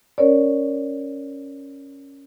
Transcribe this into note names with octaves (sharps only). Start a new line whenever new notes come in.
C#4 A#4 C#5 D5